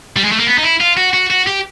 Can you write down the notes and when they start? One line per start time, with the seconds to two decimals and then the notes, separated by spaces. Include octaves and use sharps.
0.16 G3
0.24 G#3
0.32 A3
0.39 A#3
0.47 B3
0.58 D#4
0.63 E4
0.80 F4
0.97 F#4
1.13 F#4
1.30 F#4
1.47 G4